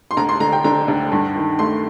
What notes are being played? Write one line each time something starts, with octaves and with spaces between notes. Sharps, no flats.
C6
D2 A#5
C6
D3 A#5
G5
D3 A#5
D2
G2
D#3
A3 C6